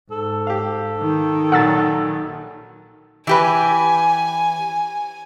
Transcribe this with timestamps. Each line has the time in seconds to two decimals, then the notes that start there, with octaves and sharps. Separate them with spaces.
0.11 G#2 A4
0.47 G4 F5
0.99 D#3
1.52 A#1 A#2 F#3 F#5 E6 A6
3.27 E3 G4 B4 G#5